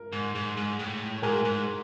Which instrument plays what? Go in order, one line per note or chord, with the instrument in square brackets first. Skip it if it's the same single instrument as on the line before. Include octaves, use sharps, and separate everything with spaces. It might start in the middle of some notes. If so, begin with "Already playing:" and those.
Already playing: [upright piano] A#4
[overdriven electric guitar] G#2
G#2
G#2
A2
[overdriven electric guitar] G#2 [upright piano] G#4 A#4
[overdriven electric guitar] G#2